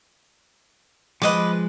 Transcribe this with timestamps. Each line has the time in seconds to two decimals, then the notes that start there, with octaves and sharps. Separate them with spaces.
1.22 F3 G#3 B4 D#5 D6